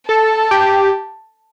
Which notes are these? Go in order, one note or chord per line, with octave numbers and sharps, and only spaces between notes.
A4 A5
G4